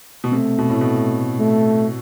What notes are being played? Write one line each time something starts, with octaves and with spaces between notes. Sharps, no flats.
B2
C3 A3
B2
A2
B2
A3